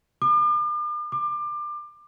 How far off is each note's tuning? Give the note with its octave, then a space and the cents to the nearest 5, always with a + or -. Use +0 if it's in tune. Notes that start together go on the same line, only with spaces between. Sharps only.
D6 +40
D6 +25